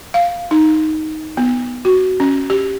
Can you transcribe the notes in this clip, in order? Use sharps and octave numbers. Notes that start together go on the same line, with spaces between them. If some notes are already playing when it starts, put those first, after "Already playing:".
F5
D#4
B3
F#4
C#4
G4